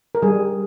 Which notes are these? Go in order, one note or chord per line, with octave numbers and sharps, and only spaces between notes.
A#4
G3 G#4